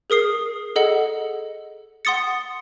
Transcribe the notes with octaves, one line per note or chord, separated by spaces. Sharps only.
G#4 A#4 D#6 C7
G#4 A4 D#5 F#5
F#5 C6 D#6 A6 C#7